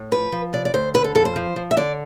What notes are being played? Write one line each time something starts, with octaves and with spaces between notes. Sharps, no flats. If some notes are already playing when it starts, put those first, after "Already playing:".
Already playing: A2
F3 B4
F3
C3 D5
D5
D2 C5
D3 B4
A4
F2 A4
C5
F3
F3
E5
D3 D5